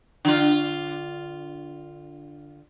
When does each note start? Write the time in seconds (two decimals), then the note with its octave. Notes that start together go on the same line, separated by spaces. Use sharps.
0.25 D3 F4